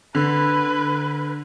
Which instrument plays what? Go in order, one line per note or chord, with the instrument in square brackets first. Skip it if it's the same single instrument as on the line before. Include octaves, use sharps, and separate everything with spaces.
[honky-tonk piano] D3 [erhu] B4